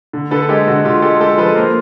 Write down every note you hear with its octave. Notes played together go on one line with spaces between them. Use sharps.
D3
D3 A4 B4
G#3 G4 A4
D3 F#4
D3 F4 G4
G#3 G4 A4
G#3 G4 A4
F3 A4 B4
A#3 A#4 C5